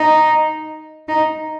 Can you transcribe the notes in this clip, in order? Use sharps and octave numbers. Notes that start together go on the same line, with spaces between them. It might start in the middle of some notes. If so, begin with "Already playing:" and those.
Already playing: D#4
D#4